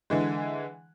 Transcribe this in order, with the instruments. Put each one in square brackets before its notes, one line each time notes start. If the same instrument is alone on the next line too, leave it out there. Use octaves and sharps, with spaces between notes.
[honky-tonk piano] D3 E3 G#3